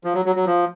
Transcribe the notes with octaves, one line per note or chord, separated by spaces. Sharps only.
F3
F#3
F#3
F#3
F3